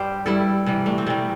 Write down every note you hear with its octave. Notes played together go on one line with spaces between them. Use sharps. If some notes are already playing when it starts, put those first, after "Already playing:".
Already playing: G2 G3 G4 C5
G2 G3 E4 A4
C3 E3 G3
A3 D4
C4
C3 E3 G3 A3